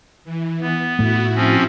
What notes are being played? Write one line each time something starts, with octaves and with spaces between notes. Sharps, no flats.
E3
B3
A2 A3 E4 F#4
F3 C4 C#4